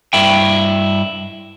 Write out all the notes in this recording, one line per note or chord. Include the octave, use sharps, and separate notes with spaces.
G2 E4 G5